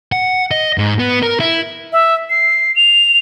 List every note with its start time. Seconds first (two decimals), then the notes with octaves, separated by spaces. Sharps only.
0.12 F#5
0.51 D#5
0.78 G#2
0.99 B3
1.23 A#4
1.40 E4
1.92 E5
2.30 C7
2.76 F7